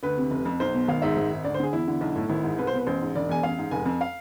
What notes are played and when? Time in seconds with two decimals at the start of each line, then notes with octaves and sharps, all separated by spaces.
0.03 D2 B4
0.17 C3
0.31 F1
0.46 F2
0.60 B1 C5
0.74 B2
0.88 G#1 F5
1.02 G#2 E5
1.17 G#1
1.31 G#2
1.44 D2 D5
1.54 C5
1.60 D3 G#4
1.73 E2 E4
1.88 D3
2.01 B1
2.16 A2
2.29 G#1 E4
2.44 G#2
2.58 C2 B4
2.67 C5
2.73 B2 B4
2.86 A1 C5
3.01 G#2
3.16 E1 D5
3.29 E2 G#5
3.43 A1 F5
3.58 G#2
3.71 F1 G#5
3.86 F2
4.01 F5